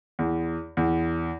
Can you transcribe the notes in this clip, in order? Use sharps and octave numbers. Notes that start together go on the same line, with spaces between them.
E2
E2